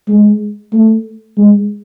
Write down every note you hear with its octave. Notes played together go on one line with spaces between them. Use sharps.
G#3
A3
G#3